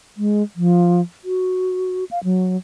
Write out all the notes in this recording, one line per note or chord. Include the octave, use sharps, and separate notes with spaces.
G#3
F3
F#4
F5
F#3